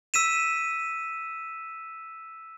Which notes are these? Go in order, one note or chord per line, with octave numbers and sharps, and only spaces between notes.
E6 B6 D#7 E7